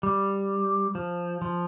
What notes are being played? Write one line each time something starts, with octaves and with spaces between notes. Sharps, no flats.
G3
F3
F3